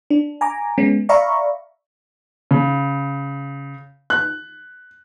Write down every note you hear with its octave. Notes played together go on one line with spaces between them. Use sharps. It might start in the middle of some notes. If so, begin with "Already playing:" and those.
D4
G#5 A#5 D6
G#3 B3 C#4
D5 E5 F5 A#5 B5 C#6
C#3
F#6